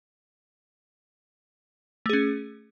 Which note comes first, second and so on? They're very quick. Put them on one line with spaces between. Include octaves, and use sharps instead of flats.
A3 G#4 C#4